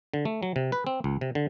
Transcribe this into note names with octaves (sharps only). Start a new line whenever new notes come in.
D3
A3
F#3
C3
B4
C4
C#2
C3
D3